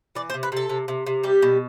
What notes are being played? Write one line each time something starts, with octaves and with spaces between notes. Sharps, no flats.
E3 D5
C5
C3
B4
C3 A4
C3
C3
C3
G3 G4
B2